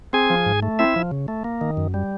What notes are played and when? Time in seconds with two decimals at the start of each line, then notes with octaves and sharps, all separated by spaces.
0.13 C4 G#4 G#5
0.30 F3
0.46 G#2
0.62 A3
0.79 C4 E4 E5
0.96 F3
1.11 C#3
1.28 A3
1.44 A#3
1.61 D#3
1.77 F#2
1.94 G3